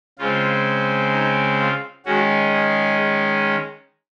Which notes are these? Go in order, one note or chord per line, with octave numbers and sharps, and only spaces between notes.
C#3 G#3 C4 F4
D#4
F4
D#3 G#3 C#4 F#4
G#4